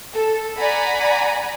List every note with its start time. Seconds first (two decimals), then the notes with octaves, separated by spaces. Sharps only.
0.14 A4
0.59 D5 F#5 G#5 A#5 B5